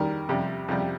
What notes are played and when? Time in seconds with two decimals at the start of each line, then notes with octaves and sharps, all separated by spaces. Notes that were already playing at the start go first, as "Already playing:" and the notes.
Already playing: D#2 D#3 G3 A#4
0.29 F2 C3 G3
0.68 F2 C3 G3